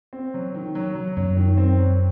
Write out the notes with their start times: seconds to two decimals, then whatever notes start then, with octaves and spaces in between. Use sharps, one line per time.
0.13 C4
0.34 F#3
0.55 D#3
0.75 F#3
0.95 F#3
1.17 F#2 F#3
1.37 D#3
1.57 C4
1.78 F#3